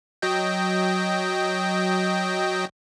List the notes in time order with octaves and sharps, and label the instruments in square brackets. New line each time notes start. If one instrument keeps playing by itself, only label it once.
[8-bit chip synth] F#3 D#5 G5